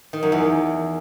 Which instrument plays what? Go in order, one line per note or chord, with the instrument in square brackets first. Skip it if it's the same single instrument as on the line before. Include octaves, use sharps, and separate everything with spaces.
[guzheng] D#3
F#2
E2